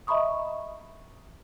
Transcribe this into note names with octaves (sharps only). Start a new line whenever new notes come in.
D#5 E5 A#5 B5 C#6 D#6